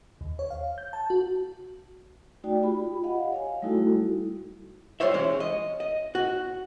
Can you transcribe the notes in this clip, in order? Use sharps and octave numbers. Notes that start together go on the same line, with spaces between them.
D#2
C#5
F5
G6
A5
F#4
A3 D#4 F#4 D5 G5
F4 G4 B5
D#5 F5 F#5
C#5 F5 G#5
G3 A3 D#4 E4 F#4 A4
G3 F4 C5 C#5 E5
E3 G#3 C#4
D#5
D#5
F#4